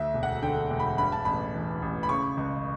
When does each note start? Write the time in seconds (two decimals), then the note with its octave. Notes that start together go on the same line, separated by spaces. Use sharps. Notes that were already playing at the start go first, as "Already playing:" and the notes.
Already playing: D2 E5
0.14 E1
0.23 F#5
0.42 D3 G5
0.70 E1
0.80 B5
0.98 G2 B5
1.12 A5
1.25 A1 B5
1.54 E3
1.82 A1
2.03 B5
2.09 C#3 C#6
2.37 C#2